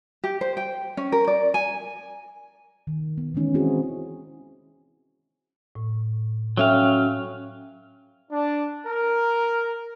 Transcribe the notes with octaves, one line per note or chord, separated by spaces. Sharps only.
G4
C5
G5
C#4
A#4
D5
G#5
D#3
B3
D#3 E3 G#3 C#4 D#4
C4 E4 F#4 G#4
A2
F#3 C#4 A4 E5 F5 G5
D4
A#4